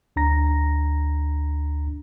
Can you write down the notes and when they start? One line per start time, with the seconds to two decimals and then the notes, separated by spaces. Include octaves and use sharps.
0.16 D2 D4 A#5 A#6